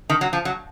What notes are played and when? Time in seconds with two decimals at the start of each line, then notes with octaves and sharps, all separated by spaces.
0.10 D#3
0.21 F#3
0.33 F3
0.45 F#3